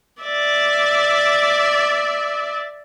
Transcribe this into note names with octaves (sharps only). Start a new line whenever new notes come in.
D5 E5